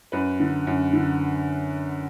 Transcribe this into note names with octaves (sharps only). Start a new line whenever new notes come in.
F#2 B4
D3
F#2
D3